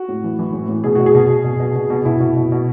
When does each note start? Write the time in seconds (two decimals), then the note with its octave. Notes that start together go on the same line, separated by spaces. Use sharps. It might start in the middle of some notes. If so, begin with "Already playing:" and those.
Already playing: F#4
0.09 A2
0.24 E3
0.39 E3
0.53 A2
0.69 A2
0.84 B2 G#4
0.95 B2 F#4
1.06 G#4
1.15 B2
1.29 B2
1.44 B2
1.60 B2
1.75 B2
1.90 B2
2.05 B2 E4
2.20 B2
2.36 B2
2.52 B2